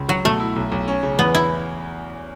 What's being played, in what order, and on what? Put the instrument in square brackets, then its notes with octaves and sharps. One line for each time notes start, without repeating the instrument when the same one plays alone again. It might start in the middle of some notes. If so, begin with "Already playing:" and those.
Already playing: [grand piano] C#2
[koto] F#3 [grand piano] F#4
[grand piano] B2 [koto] A3
[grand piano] E4
B1
B1
C#4
C#3
[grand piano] E2 [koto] B3
[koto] E4